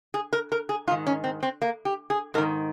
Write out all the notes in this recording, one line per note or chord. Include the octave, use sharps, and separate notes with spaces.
G#4
A#4
A#4
G#4
G#2 D#3 F4
C#4
C4
C4
A#3
G4
G#4
G#2 D#3 A#4